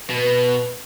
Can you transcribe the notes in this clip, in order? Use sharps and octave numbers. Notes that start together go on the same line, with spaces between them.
B2 B4